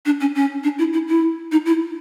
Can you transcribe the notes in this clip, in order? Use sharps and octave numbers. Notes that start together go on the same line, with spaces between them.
D4
C#4
C#4
D4
E4
E4
E4
D#4
E4